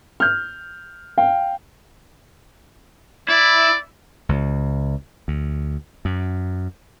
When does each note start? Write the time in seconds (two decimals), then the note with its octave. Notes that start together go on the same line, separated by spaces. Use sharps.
0.20 F6 G6
1.18 F5 G5
3.29 E4 D5
4.29 C#2
5.28 D2
6.05 F#2